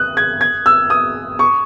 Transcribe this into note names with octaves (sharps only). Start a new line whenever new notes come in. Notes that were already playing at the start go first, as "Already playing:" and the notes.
Already playing: D#6 F#6
G#6
G#6
E6
D#6
C#6